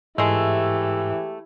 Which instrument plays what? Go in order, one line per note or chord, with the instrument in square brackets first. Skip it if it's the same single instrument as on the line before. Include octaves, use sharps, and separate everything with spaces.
[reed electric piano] G#2 [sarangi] E3 [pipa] G#3 A3 [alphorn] G4